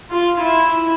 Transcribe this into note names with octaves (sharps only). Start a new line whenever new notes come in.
F4
E4